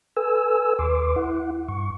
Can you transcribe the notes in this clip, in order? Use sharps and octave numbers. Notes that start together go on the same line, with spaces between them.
A4 B4 G#5 E6
D#2 B4 C6 D6
E4 F#5
G2 C#6